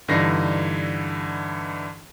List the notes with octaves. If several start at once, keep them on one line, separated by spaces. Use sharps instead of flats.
G2 D3 E3 D#4 A#6 C7